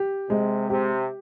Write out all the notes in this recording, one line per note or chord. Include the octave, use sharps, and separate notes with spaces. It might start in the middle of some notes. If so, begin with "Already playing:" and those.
Already playing: G4
C3 G#3
C3 G4